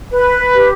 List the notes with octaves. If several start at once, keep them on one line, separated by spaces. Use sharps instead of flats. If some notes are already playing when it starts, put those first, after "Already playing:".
B4
G4